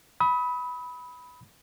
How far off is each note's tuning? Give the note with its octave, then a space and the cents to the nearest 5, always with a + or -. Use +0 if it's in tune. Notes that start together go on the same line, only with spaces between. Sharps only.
B5 +0 D#6 +40